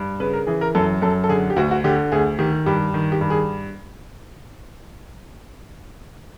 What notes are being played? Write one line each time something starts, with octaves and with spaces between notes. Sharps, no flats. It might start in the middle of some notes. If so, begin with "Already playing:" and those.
Already playing: G2
C#3 B4
A#4
E3 G#4
A#4
F#2 A4
F#2 A4
A4
D3 G#4
G4
D2 F#4
F#4
D3 G4
D2 G#4
D#3 G4
G2 G4
D#3
G4
G2
G#4